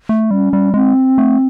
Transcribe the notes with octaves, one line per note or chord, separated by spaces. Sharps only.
A3
G3 C#4
G3
G#3 C4
A3